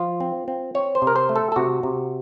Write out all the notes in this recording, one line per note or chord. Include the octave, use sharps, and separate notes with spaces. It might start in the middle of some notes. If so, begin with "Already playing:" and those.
Already playing: F3 F4
C4
C4
C4 C#5
C5
C3
A#4
C5
A3
A4
A4
C3 F#4
C3